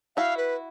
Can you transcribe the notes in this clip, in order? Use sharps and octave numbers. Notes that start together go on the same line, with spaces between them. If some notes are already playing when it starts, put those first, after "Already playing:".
E4 F#4 F5
B4